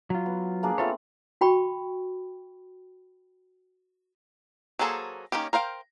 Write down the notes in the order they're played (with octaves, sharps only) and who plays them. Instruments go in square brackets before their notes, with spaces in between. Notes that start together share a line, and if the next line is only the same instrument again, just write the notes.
[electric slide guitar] F#3 F4
[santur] B3
A#3 D4 G#4
[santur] A3 B3 C4 [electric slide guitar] F4 A4 C#5
[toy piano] F#4 G5 B5 C#6
[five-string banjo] F#3 A#3 G#4 A4 C5
D#3 G#3 A#3 C#4 G4
A#4 C5 F5 G5